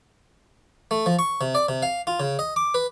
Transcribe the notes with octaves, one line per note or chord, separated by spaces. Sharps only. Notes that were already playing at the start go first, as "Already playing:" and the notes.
A3
F3
C#6
C3
D5
C3
F5
F4
C#3
D#5
D6
B4